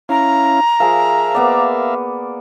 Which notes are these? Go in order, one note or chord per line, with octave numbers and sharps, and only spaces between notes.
C#4 E4 F5 A#5
F3 G#4 A#4 E5 F5
A#3 B3 D5